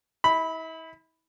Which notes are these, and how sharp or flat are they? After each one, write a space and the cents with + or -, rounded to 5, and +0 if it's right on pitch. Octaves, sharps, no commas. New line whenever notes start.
E4 -40 B5 +0